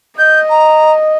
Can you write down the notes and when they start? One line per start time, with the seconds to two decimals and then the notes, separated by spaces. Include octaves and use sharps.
0.19 D#5 G6
0.50 A#5